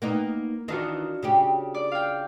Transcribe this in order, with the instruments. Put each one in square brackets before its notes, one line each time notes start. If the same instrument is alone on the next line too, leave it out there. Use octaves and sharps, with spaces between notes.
[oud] A#3 B3 D#4
[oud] D#3 E3 D#4 [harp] D4 F4 F#4
[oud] C#3 C#4 G4
[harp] D5
F5 G5